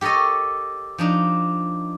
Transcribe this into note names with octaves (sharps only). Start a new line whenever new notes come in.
G4 A4 A#4 C#5 D#5
F3 D4 D#4